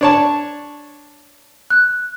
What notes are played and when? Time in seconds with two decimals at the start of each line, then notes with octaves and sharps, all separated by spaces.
0.01 D4 C#5 A5
1.70 F#6